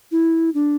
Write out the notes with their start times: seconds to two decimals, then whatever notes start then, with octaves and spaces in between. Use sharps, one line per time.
0.12 E4
0.54 D4